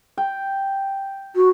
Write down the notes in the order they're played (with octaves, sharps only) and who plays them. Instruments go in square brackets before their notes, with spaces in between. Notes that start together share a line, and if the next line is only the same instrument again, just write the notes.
[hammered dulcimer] G5
[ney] F#4